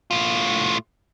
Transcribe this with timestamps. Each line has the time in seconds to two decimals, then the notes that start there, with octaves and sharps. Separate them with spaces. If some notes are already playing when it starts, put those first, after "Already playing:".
0.11 A2 F4